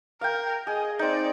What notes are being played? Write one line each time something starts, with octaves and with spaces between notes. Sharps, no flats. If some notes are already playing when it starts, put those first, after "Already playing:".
A#4 F5 G5
G#4 D#5
C4 D#4 D5